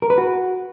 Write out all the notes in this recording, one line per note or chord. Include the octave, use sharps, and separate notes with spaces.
A#4
B4
F#4